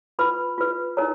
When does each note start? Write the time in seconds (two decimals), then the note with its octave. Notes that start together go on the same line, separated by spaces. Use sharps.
0.19 F4 B4 B5
0.58 F4 B4
0.97 D#4 A#4 C#5 A#5